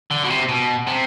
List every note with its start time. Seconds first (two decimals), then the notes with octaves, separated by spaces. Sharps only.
0.11 D3
0.23 B2
0.30 C3
0.49 B2
0.87 C3